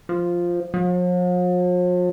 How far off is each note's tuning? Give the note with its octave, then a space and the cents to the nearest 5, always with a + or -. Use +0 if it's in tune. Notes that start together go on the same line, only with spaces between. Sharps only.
F3 +0
F3 +45